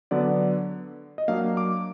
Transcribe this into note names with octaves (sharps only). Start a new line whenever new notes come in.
D3 F#3 B3 D5
D#5
F#3 A#3 D4 F5
D6